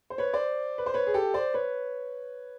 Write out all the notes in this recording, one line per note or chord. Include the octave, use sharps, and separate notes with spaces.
C5
B4 C#5
C5 D5
B4
C5
B4 C#5
G#4
G4 A4
C5 D5
B4 C#5